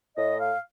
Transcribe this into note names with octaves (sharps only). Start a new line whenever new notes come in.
A2 D#5
F5